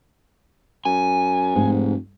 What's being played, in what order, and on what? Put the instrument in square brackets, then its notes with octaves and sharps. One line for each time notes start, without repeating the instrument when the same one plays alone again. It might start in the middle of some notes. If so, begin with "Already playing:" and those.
[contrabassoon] F#2 [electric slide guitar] G#5
[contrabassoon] F1 [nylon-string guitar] G#2